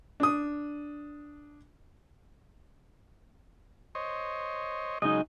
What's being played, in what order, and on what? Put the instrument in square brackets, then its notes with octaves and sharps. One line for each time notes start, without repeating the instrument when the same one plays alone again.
[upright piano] D4 D#6
[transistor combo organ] C5 C#5 D#5
[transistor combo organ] C#3 F#3 G#3 [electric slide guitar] D#4 D#5